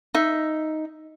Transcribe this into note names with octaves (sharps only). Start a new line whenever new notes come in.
D#4 E5